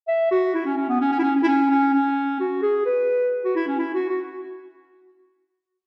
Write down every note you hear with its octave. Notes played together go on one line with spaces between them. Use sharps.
E5
F#4
E4
C#4
C#4
B3
C#4
C#4
E4
C#4
C#4
E4
C#4
C#4
C#4
F#4
G#4
B4
F#4
E4
C#4
E4
F#4
F#4